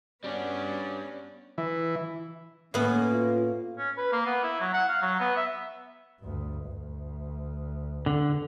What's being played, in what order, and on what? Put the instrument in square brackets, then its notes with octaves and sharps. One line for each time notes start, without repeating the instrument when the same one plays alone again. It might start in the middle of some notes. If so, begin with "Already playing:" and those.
[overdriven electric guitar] G3 D4 [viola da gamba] B3 C#4 F#4 [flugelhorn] D5
[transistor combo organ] E3
[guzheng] A2 B3 [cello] A#3 [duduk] C#4
[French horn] F4
[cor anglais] C#4
B4
A#3
B3
E4
F#3
F#5
F5
F#3
B3
E5
[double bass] D2 G2
D2
[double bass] E2 [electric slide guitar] D3